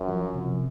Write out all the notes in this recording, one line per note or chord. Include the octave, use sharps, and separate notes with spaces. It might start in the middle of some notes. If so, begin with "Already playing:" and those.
Already playing: F#2
F3
C3